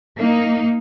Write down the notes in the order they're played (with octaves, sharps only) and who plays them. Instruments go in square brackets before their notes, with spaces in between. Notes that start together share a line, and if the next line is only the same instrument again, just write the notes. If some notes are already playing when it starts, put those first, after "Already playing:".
[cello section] A#3 D#4